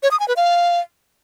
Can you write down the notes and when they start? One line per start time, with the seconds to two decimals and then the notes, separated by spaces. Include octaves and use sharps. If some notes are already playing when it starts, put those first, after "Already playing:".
0.03 C#5
0.11 D#6
0.20 G#5
0.28 B4
0.37 F5